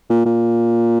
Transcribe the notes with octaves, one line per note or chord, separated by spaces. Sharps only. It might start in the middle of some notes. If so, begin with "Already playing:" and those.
A#2
A#2